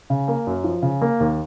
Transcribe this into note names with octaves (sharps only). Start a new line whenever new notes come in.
C#3
A#3
F#2
F3
C#3
A#3
D#2